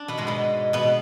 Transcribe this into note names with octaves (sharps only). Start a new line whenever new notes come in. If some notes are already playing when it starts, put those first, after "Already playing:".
Already playing: D4
B2 B3
G#2 G#3
B2 B3
B2 B3